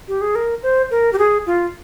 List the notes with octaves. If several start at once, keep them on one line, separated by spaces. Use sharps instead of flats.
G4
G#4
A#4
C5
A#4
G4
G#4
F4